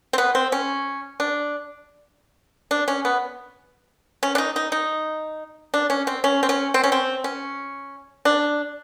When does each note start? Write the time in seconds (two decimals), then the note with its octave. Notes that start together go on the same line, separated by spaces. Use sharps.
0.13 C4
0.18 B3
0.35 C4
0.52 C#4
1.20 D4
2.71 D4
2.88 C#4
3.05 B3
4.23 C#4
4.35 D4
4.38 D#4
4.56 D#4
4.72 D#4
5.74 D4
5.90 C#4
6.07 C4
6.24 C#4
6.43 C4
6.49 C#4
6.74 C4
6.84 C#4
6.92 C4
7.24 C#4
8.25 D4